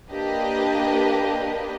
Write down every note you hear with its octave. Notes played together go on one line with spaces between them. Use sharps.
A#3 D4 G4 B4 D#5